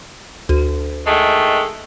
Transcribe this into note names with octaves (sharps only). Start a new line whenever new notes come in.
D2
D#3 G#3 A3